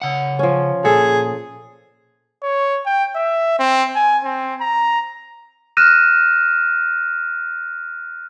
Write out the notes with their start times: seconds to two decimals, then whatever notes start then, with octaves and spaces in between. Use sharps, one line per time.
0.02 C#3 F#5
0.39 F3 C#4
0.85 A#2 G#4 A4
2.43 C#5
2.86 G5
3.15 E5
3.59 C4
3.95 G#5
4.24 C4
4.61 A#5
5.77 F6 F#6 A#6 D#7 E7